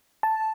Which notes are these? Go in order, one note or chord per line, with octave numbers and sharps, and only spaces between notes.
A5